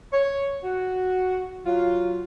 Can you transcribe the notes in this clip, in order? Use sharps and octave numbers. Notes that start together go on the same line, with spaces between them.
C#5
F#4
F#3 F4